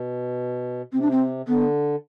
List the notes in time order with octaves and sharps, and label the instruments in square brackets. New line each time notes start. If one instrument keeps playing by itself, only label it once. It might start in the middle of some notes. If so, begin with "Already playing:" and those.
Already playing: [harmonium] B2
[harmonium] C3 [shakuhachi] C4
[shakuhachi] D4
C4
[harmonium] D3 [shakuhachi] B3